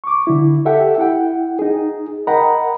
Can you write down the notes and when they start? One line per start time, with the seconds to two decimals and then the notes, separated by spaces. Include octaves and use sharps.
0.04 C#6 D6
0.27 D3 E4
0.65 G4 A4 E5 F#5 G5
0.98 E4 F#5 G5
1.59 D#4 G#4
2.27 A#4 D#5 F#5 G5 A#5 B5